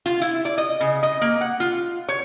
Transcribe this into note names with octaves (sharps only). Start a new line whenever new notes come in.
F4
E4
D5
D#5
C#3
D#5
A#3
F#5
F4
C#5